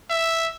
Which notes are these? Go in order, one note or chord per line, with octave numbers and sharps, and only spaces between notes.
E5